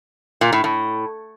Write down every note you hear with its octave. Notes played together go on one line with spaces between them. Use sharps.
A#2
A2
A2